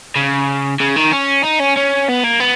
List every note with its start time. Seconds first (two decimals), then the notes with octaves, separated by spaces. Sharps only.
0.16 C#3
0.80 C#3
0.97 D#3
1.13 C#4
1.45 D#4
1.60 C#4
1.77 C#4
2.09 B3
2.24 A#3
2.40 B3